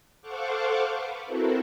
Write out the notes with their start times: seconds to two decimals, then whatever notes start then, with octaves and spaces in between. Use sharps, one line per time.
0.21 A4 C5 F5 F#5 C#6 D6
0.94 B4
1.26 C4 E4 F#4 A4 A#4